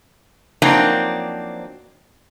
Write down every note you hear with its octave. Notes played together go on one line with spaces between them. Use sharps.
F3 F#3 A#3 C4 D4 D#4